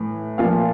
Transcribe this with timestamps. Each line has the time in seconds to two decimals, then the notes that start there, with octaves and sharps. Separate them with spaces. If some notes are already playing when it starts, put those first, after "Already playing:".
Already playing: A2 E3
0.38 A#2 F3 F5